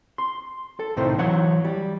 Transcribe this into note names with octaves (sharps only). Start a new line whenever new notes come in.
C6
A4
C2 A2 C3 D#3 E4 C5
E3 F#3 C#5 F#5
G3